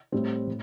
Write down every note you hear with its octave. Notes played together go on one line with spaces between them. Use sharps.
A2 G3 C4
A2